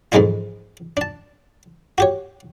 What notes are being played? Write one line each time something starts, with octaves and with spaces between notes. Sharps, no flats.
F2 G#2 E3 G#3 D#4 E4
D4 A5
F#4 G4 C#5